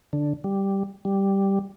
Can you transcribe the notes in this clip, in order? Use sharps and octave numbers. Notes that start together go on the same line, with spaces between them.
D3
G3
G3